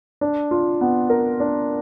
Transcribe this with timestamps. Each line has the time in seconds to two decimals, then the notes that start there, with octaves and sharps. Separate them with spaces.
0.21 D4
0.51 F4
0.81 B3
1.10 A#4
1.40 D4